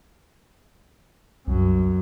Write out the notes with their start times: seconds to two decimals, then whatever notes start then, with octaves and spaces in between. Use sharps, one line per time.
1.47 C2 F#2